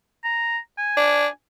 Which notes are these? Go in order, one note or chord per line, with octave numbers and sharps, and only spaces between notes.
A#5
G#5
D4